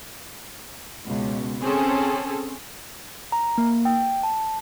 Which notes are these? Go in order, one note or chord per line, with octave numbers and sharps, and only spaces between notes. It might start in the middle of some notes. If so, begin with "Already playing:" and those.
C#2 B2
C4 C#4 G#4 A4
A#5
A#3
G5
A5